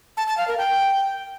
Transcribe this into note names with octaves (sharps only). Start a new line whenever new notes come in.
A5
A5
F5
A#4
G5